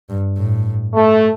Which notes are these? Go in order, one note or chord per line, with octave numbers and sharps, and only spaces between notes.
G2
A2
A3